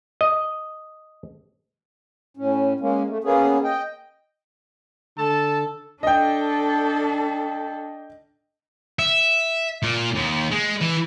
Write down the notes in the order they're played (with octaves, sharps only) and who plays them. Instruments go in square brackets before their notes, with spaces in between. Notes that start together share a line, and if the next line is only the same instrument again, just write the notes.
[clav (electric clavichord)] D#5
[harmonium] A2 C#4
G#3 A#3 C#4
A3
A#3 B3 C#4 G#4
D#5 G5
[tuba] D3 [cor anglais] A4 [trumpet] A5
[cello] D4 A4 [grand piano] D#5 G5
[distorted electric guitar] E5
A#2
D#2
G#3
E3